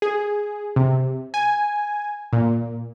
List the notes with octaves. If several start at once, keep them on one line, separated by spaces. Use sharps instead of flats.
G#4
C3
G#5
A#2